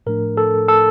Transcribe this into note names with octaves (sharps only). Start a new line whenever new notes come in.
A2 F3 A3 D4 A#4
A4
A4